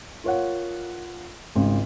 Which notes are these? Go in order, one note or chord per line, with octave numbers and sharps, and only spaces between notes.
F4 A#4 C#5 F5 F#5
G#1 C#2